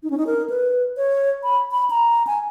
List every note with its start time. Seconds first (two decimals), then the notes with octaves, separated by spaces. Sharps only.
0.03 D#4
0.10 C#4
0.18 D#4
0.27 A#4
0.50 B4
0.97 C#5
1.43 B5
1.72 B5
1.90 A#5
2.27 G#5